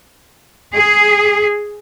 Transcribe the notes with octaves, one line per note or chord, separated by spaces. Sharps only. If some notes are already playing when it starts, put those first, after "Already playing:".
G#4